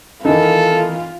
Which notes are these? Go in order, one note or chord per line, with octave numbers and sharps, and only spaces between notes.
D#3 E3 D#4 F4 A4